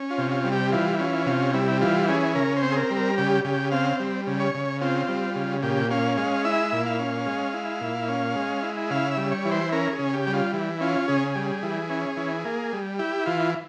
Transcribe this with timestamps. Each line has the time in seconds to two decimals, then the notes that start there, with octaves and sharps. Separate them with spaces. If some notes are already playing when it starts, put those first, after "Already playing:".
Already playing: C#4
0.10 F4
0.18 C3
0.31 F4
0.44 G3
0.52 G4
0.72 E3 F4
0.99 C#4 F4
1.26 C3 F4
1.54 G3 E4
1.81 E3 F4
2.08 C#4 G#4
2.35 C#3 A#4
2.56 C5
2.63 C4
2.72 G#4
2.76 A#4
2.90 G3
2.96 A#4
3.18 C#3 G4
3.44 C#3 G4
3.71 C4 F5
4.00 G3
4.27 C#3
4.40 C#5
4.54 C#3
4.81 C4 F4
5.08 G3
5.35 C#3
5.63 A#2 G4
5.91 C#4 F5
6.17 G#3 F5
6.45 E4 E5
6.72 A#2
6.86 F5
6.99 C#4
7.26 G#3
7.53 E4
7.81 A#2
8.08 C#4
8.36 G#3
8.63 E4
8.90 C#3 F5
9.11 E5
9.17 G3
9.31 C#5
9.45 E3
9.51 C5
9.72 C#4 A#4
9.92 G#4
9.99 C#3
10.14 G4
10.27 G3
10.33 F4
10.53 E3
10.81 C#4 F4
11.08 C#3 G#4
11.36 G3
11.63 E3
11.90 C#4
12.17 E3
12.45 A#3
12.73 G3
12.99 E4 G4
13.26 E3 F4